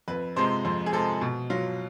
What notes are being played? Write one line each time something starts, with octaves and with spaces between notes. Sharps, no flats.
F2 B4
C3 F3 G#3 C5
F2 C5
G#4
C3 F3 G#3 A4
B2
F#3 F4